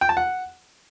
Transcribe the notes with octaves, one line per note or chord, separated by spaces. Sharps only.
G5
A5
F#5